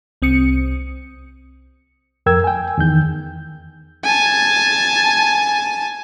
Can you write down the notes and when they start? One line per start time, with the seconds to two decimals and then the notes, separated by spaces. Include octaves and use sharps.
0.22 C2 C4 D#6 C#7
2.26 F2 A#4 G5 E6 G#6
2.44 G5 G#5
2.78 E2 D#3 G6
4.04 G#5 A5